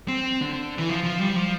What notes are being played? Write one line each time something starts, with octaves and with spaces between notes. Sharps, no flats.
C4
D3
E3
F3
F3
G3
F3